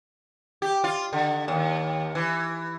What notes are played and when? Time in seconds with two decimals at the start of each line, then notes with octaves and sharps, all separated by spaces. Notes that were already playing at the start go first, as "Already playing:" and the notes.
0.62 G4
0.84 F4
1.13 D3
1.48 D#2
2.15 E3